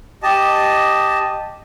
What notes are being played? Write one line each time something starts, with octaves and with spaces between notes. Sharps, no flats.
G4 D#5 A5